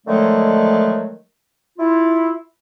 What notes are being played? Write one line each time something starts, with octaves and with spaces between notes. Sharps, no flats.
D3 D#3 F3 F#3 G#3 A3
E4 F4